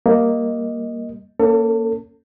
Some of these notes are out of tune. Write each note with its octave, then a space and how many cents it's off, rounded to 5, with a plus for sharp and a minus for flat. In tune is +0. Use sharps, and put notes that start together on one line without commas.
G3 +0 A#3 +0 D#5 +0
A#3 +0 C#4 +0 A4 +30